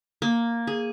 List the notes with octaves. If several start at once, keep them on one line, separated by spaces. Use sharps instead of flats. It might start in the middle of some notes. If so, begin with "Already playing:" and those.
A#3
G#4